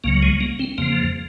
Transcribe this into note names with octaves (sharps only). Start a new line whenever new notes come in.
C#2 C#3 F#3 A#3
G#3
A#3
C4
F2 C#3 F3 A#3